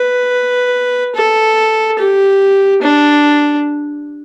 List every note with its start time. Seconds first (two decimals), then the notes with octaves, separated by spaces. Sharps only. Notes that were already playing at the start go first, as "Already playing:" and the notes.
Already playing: B4
1.15 A4
1.99 G4
2.82 D4